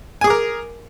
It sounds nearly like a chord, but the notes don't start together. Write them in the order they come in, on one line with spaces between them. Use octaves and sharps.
G#5 G#4 D6 A#4